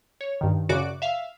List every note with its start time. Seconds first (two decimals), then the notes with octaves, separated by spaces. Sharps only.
0.21 C#5
0.41 G2 D#3
0.69 F#2 C#3 F#4 D5 D6
1.02 E5 F5